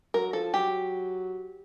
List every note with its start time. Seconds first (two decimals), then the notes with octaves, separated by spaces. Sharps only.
0.14 F#3 A#4
0.33 F3 A4
0.54 F#3 G4